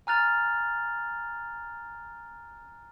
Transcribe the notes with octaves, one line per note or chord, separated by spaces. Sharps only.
G#5 A#5 F6 F#6 A6 F7